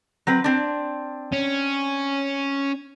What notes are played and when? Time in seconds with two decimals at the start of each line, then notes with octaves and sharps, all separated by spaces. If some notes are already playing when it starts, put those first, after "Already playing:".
0.27 F#3 C4 B4
0.44 C4 D4
1.32 C#4